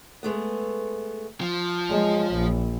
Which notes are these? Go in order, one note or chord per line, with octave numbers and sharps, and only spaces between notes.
G#3 A3 B3
F3
F#2 G#3
A#1